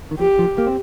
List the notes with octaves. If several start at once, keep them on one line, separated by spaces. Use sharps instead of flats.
D#3
F3 G4
F3
A#3
C4